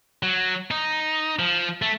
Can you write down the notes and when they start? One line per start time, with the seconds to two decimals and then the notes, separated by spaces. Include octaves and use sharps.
0.23 F#3
0.71 D#4
1.39 F3
1.82 A3